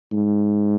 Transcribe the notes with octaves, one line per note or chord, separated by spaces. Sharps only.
G#2